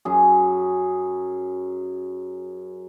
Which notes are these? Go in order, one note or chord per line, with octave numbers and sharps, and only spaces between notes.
F#2 G#4